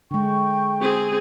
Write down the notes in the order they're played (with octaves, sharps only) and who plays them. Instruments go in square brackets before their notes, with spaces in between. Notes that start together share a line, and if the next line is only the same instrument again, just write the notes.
[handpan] D3 G#3 [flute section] G5 C#6
[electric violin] C4 G#4